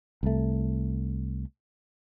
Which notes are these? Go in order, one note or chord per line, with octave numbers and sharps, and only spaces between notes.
C2 A3